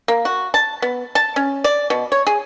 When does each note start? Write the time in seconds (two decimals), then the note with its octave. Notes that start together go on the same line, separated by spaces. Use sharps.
0.08 A#3
0.25 F#4
0.54 A5
0.82 B3
1.15 A5
1.36 C#4
1.64 D5
1.90 B2
2.12 C#5
2.27 G#4